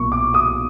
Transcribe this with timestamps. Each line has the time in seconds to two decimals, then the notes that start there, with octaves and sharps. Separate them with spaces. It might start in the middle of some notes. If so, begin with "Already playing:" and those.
Already playing: B1 A#2 A#3 C#6
0.12 D6
0.34 D#6